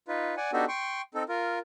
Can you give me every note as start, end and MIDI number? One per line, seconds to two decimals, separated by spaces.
0.08 0.35 63
0.08 0.35 65
0.08 0.35 71
0.37 0.51 74
0.37 0.51 78
0.37 0.51 80
0.53 0.65 59
0.53 0.65 62
0.53 0.65 63
0.53 0.65 66
0.53 0.65 67
0.53 0.65 69
0.68 1.01 79
0.68 1.01 84
0.68 1.01 85
1.14 1.23 60
1.14 1.23 63
1.14 1.23 69
1.29 1.59 65
1.29 1.59 70